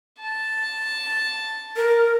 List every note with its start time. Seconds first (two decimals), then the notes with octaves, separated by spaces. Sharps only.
0.21 A5
1.77 A#4